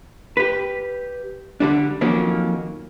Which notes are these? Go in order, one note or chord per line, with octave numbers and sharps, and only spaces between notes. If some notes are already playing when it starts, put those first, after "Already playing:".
G4 B4
D3 G3 D4
F2 D#3 F#3 A#3 C#4